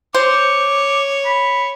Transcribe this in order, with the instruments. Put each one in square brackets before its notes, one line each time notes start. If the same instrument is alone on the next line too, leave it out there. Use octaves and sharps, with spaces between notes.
[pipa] C5 [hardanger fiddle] C#5 [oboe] D6
[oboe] B5